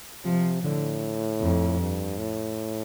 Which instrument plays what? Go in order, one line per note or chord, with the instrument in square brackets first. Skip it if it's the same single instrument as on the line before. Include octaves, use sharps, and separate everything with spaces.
[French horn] C3 [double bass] F3
[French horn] A2 [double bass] D3
[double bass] F2
[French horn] G2
A2